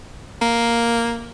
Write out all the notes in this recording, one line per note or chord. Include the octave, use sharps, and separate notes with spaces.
A#3